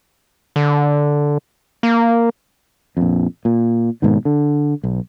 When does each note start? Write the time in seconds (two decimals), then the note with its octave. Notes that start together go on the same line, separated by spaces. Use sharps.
0.56 D3
1.83 A#3
2.97 A#1 F2
3.45 A#2
4.02 G#2 B2 D#3
4.25 D3
4.84 B1